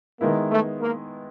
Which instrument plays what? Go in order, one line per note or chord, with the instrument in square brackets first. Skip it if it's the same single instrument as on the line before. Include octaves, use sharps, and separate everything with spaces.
[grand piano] D#3 G#3 B3 E4 [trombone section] A#3
[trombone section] A3
A#3